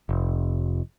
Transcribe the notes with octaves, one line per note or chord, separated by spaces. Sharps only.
F1